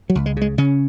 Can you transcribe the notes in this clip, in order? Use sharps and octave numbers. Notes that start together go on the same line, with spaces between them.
F#3
C#2
G#3
C#3 G#3
C#3 C#4